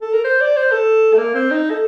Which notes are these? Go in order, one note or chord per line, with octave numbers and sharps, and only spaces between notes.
A4
A#4
C5
D5
C5
A4
A3
A#3
C4
D#4
A4